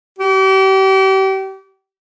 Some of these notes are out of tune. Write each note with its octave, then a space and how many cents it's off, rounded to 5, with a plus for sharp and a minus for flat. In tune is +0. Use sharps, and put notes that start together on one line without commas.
G4 -35